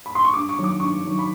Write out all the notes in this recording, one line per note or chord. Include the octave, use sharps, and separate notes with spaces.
B5
C6
C#6
G2 D6
C#6
D#3 F#3
D6
G2 C#6
D#3 F#3
B5